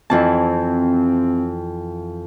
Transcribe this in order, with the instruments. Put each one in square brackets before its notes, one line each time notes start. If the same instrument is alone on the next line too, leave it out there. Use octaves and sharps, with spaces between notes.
[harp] F2 E3 A5 [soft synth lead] C4